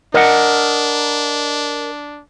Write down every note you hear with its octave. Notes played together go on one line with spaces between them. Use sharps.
D4 A#4 D#5 F#5